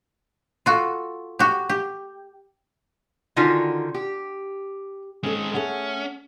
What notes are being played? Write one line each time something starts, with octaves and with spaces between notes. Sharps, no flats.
F4 F#4 A4
F#4 G4
G4
D3 D#3 C#4 D#4 F4 F#4
G4
G#3 C4 C#4 A4
A3 C#4 G#4 F#5